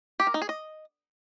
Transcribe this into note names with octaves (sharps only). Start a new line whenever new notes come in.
G4
A#4
D#4
G#4
D#5